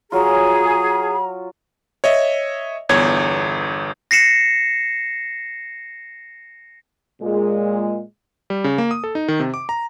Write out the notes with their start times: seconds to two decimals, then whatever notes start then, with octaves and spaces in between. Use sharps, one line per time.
0.12 F#3 F4 G#4 A#5
2.04 C#5 D#5 E5
2.89 G1 E2 C#5 G#6
4.11 A#6 C7 C#7 E7
7.21 A#2 G#3
8.50 G3
8.64 C#3
8.78 A#3
8.91 D#6
9.04 A4
9.15 D#4
9.28 D#3
9.40 C3
9.54 D6
9.69 A#5